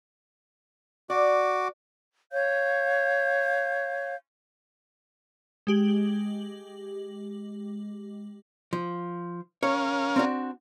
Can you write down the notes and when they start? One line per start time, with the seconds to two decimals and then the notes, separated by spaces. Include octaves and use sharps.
1.10 F#4 D5 D6
2.33 C#5 F5 G6
5.67 G#3 G4 F#7
8.73 F3
9.63 C#4 A#4 C#5 F5
10.16 C4 D4 F#4